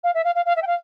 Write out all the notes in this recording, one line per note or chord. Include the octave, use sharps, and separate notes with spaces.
F5
E5
F5
F5
F5
E5
G5
F5